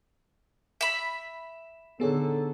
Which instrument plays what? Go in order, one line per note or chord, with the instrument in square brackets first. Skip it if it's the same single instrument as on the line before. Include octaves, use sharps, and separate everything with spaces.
[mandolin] E5 B5
[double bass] D3 [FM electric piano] B3 G#4 C#5 [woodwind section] D#4 A4